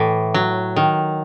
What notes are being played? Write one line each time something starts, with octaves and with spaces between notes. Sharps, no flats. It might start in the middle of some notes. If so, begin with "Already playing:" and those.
Already playing: A2 E3
F#3
D#3